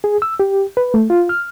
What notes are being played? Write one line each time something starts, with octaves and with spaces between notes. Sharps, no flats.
G#4
E6
G4
B4
A3
F4
F6